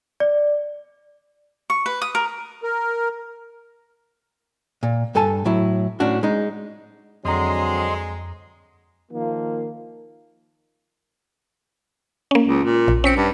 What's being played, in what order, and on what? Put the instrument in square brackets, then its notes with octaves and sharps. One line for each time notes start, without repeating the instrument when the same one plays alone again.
[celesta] D5
[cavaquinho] C#6
B4
D#6
A#4
[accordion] A#4
[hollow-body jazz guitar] A#2
G2 A4 G#5 A5
A2 F#3 E4
A2 C#4 D4 F#4
G#3 D#4
[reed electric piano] F2 A#5 [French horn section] D3 F#3 C4 [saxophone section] G#3 [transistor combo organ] D#5 C6
[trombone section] D#3 F3 A#3
[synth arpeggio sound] A#3 C#4
[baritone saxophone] C#2
A#2
[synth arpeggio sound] A#1
[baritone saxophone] C4 [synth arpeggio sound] C#4 B6 C#7
[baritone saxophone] G2